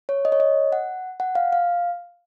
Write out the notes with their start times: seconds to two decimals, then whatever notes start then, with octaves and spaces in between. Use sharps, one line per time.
0.09 C#5
0.25 D#5
0.32 C#5
0.40 D#5
0.72 F#5
1.20 F#5
1.35 F5
1.53 F5